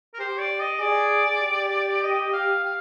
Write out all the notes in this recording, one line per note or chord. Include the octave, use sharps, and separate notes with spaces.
A#4
G4 C5
D5
D#5
G#4 D5
G4
D#5
F5
F5